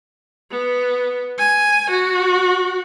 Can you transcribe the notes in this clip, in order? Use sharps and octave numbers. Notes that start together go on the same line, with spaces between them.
B3
G#5
F#4